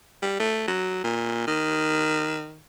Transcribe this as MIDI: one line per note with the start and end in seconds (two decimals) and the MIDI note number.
0.22 0.36 55
0.40 0.63 57
0.68 1.01 54
1.04 1.46 46
1.47 2.59 51